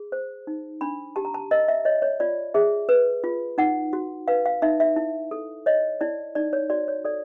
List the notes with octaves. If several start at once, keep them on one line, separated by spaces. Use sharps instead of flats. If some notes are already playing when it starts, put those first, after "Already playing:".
Already playing: G#4
C5
D#4
D4 B5
G4 A5
A#5
A5
A#4 D#5
E5
C#5 D#5
C#5
F4 D5
G#4 E5
B4
F4
D#4 F#5
F#4
B4 F5
F5
D#4 E5
E5
E4
A4
C#5 D#5
E4 D5
D#4 D5
C#5
F#4 D5
C#5
A4 D5